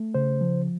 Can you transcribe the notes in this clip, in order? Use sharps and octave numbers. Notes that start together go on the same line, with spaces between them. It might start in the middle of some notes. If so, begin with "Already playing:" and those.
Already playing: A3
C#3 C5
F3